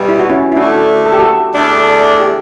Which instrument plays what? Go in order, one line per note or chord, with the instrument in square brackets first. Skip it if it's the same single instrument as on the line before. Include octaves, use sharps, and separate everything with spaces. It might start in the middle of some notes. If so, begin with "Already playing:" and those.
Already playing: [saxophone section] E2 B2 G3
[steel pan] E4
F#4
C#4 E4
E4
[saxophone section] D2 D3 A3 [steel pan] D4 F#4
[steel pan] A4
G4
F#4 A4
[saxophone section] E2 D3 A3 D4
[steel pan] G4